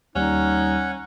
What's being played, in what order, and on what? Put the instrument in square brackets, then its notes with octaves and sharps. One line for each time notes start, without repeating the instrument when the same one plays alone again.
[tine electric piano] D#2 G3 [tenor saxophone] C#4 [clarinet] D#4 [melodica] F#5